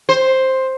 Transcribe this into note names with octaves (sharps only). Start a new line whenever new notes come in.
C5